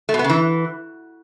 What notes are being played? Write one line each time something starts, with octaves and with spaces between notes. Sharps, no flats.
A3
B2
B3
C#3
E3